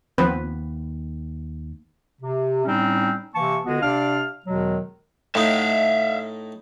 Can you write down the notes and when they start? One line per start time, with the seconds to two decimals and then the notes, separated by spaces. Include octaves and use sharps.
0.18 D#2 F3 B3 C4 B4
2.22 C3
2.65 A2 G3 C4 C#4 D#4
3.35 C3 E3 A#3 A5 C#6
3.65 C#2 D3 G#3 B3 F#4
3.82 C3 D4 D5 F5 F6
4.46 E2 B2 D#3 F#3 G#3
5.35 A2 D#4 E5 F5